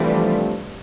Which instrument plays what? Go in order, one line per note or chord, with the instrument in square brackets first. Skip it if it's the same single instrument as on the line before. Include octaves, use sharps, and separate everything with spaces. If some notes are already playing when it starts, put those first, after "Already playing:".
Already playing: [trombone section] C3 F3 A3 D4 [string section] E3 G3